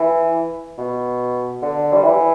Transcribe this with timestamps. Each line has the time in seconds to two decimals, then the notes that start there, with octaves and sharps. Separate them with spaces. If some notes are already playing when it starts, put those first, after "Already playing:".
Already playing: E3
0.78 B2
1.62 D3
1.93 G3
2.04 E3